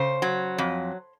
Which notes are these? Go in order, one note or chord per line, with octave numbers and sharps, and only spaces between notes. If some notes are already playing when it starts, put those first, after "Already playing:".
Already playing: C#3 C5
F#3
F2